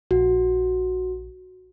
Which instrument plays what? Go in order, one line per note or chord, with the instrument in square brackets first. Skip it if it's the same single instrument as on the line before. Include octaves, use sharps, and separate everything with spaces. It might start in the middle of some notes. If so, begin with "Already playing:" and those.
[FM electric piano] A#1 [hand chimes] F#4